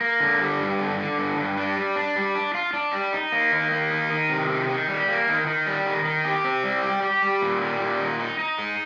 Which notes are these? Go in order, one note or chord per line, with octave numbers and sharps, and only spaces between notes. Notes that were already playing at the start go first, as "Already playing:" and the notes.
A#3
D3
G3
G2
D3
D3
G2
G2
D4
G3
D4
G3
D4
F4
D4
G3
D#4
A#3
D#3
A#3
D#4
D#3
C3
D#3
D#3
G3
A#3
D#3
D#3
G3
D#3
D#3
G4
C4
G3
G4
G4
G3
A#2
G3
A#2
D#4
D#4
D#4
G#3